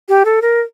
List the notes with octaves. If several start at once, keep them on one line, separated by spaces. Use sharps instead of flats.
G4
A4
A#4